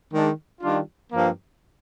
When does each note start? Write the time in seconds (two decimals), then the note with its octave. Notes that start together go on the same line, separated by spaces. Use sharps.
0.12 D#3 G#3 D4
0.61 D#3 G3 D4 F4
1.11 G2 F3 A#3